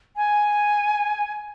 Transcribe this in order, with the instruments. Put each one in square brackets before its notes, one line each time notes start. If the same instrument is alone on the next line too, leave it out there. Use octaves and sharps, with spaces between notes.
[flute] G#5